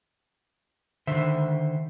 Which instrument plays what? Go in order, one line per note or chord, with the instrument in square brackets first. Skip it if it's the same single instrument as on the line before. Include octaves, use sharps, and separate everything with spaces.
[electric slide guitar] D3 D#3 C5 E5